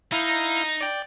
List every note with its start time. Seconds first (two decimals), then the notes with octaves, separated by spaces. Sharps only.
0.12 D#4 E4 F5 G6
0.81 D5 G5